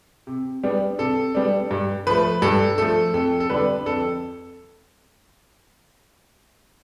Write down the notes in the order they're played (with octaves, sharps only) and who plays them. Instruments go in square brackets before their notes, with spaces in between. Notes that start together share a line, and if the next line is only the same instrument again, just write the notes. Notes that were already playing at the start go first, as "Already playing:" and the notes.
[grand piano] C3
G3 B3 D4
C3 A4
G3 B3 D4
G2
F3 A3 B4
G2 A4
F3 A3 A4
F2 A4
A4
D3 G3 B3 D4 B4
F2 A4